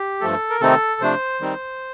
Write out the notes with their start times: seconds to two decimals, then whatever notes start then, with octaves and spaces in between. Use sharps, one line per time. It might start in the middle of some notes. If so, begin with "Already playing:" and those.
Already playing: G4
0.21 G2 F3 A3 A4
0.50 A#4
0.61 C3 D#3 A3 C4 D#4 A4
1.01 C3 F3 A3 D4 C5
1.40 D#3 G3 C4 D#4